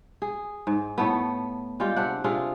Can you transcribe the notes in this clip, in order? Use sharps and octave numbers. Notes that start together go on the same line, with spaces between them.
G#4
G#2
A2 A3 B3
G3 G#3 F4 G4
C3 D4 F#5
C3 D4 F4 G#4